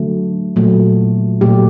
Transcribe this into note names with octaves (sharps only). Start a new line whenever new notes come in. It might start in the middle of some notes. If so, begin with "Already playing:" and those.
Already playing: D3 F#3 A3
A#2 F#3 A3
A#2 F#3 A3 G4